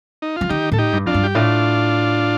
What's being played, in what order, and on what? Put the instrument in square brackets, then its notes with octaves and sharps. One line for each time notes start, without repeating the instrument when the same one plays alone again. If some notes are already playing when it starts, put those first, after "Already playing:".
[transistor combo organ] D#4
[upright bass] F3 [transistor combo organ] F4
[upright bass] D#3 [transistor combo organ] D#4 G4
[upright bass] A2 [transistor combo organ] A4
[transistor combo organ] D#4 G4
[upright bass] G2
[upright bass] F2 [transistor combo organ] D4 F4
[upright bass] G2
[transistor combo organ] G4
[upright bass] A2 [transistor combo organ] D4 F4